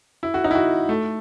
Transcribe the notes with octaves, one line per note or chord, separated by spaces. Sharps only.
E4
F#4
D#4
E4
F#4
A3